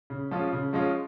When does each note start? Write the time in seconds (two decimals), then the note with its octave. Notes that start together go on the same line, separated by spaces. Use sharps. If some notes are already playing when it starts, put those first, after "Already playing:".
0.10 C#3
0.31 F3 G#3 C#4 F4
0.53 C#3
0.73 F3 G#3 C#4 F4